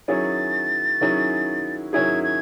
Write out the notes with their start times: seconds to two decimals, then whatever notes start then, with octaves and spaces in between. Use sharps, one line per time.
0.08 D#3 F#3 C#4 E4 G#4 A6
1.01 D#3 F#3 C#4 E4 G#4
1.93 D#3 F#3 C#4 E4 G#4 G#6
2.24 G#6